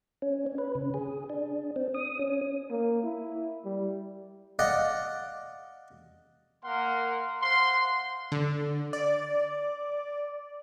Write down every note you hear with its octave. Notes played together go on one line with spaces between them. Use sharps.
C#4
C#4
B4
C#3
G#4
D4
C4
D#6
C#4
A#3
E4
G3
D5 D#5 F5 F#5
A#3 A#4 F5 F#5 C6
C5 F5 F#5 C6
D3
D5